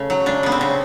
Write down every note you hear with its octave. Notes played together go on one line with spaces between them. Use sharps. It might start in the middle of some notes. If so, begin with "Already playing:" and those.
Already playing: C#3 A3
F#3
C#3 D4
C#3 B3
C4
C#3